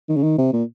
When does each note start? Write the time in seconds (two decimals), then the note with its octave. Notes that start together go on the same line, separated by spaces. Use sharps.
0.09 D#3
0.16 C#3
0.23 D#3
0.38 C3
0.53 A#2